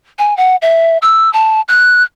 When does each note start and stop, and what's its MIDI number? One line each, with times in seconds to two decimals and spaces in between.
0.19 0.36 80
0.37 0.56 78
0.62 0.98 76
1.02 1.31 88
1.33 1.61 81
1.68 2.03 90